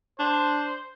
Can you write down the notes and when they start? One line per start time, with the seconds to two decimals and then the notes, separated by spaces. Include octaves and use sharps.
0.20 D4 C5